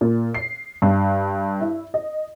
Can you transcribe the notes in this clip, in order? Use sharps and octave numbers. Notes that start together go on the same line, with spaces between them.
A#2
C7
G2
E4
D#5